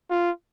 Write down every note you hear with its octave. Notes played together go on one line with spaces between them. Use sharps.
F4